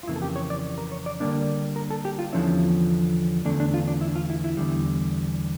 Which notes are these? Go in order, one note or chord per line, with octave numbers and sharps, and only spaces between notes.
F4
F2 C#3 E3 A#3 E4
A4
G4
C#5
D5
A#4
C#5
D5
D3 G3 A#3 D4 D5
A#4
A4
G4
F4
E2 D3 F3 C#4 E4
E2 D3 A3 D4
D4
F4
D4
E4
F4
E4
E4
E2 D3 G3